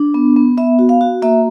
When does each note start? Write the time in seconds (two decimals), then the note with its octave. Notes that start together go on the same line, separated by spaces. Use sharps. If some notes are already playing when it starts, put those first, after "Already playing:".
Already playing: D4
0.14 B3
0.36 B3
0.57 B3 E5
0.79 F#4
0.89 F5
1.01 F#4
1.22 A#3 E5